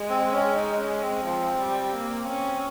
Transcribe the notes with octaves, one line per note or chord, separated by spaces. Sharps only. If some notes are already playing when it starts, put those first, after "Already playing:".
Already playing: G#3
C4
C#4
D#4
C#4
C4
F3
G3
A#3
C#4